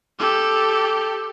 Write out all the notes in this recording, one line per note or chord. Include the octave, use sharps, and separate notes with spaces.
G4 A4